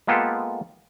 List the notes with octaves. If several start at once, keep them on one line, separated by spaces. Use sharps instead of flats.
G#3 A#3 B3 F4 G4 A4